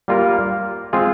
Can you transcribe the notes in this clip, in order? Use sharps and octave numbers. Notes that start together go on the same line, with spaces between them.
G3 A#3 F4 A#4 F5
G#3 C4 F4 G#4